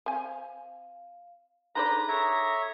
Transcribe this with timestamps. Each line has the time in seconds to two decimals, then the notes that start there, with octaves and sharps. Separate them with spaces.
0.06 C4 F5 G#5
1.75 D3 D#4 G#4 A4 B4 C5 D5 A#5
2.09 A4 C#5 E5 A#5 D6 D#6